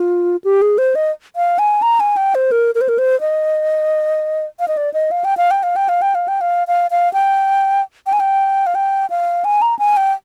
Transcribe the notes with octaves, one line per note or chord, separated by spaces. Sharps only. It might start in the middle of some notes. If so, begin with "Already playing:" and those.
Already playing: F4
G4
G#4
C5
D#5
F5
G#5
A#5
G#5
G5
C5
A#4
A#4
C5
A#4
C5
D#5
F5
D#5
D5
D#5
F5
G5
F5
G5
F5
G5
F5
G5
F5
G5
F5
F5
F5
G5
G5
G#5
G5
F5
G5
F5
G#5
A#5
G#5
G5